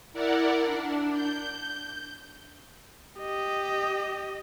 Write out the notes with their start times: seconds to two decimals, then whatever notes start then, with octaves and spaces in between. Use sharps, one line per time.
0.13 E4 A#4 D5 F#5
0.61 D4
1.11 G6
3.20 G4 D#5